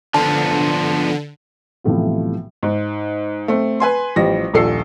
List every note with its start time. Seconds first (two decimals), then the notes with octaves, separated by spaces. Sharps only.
0.14 D3 F3 B3 A5
1.84 B1 A2 C3 E3 F3
2.63 G#2
3.48 A3 C4
3.80 B4 G#5 C6
4.16 A1 F3 G3 A#6
4.54 D#1 A#1 A4 C7